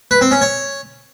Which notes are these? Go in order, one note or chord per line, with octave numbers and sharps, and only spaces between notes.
B4
C4
C#4
C#5